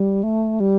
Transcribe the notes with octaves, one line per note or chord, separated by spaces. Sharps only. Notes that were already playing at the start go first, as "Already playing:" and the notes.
Already playing: G3
A3
G3